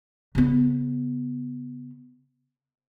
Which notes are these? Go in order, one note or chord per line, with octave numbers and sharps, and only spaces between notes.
C#3 B3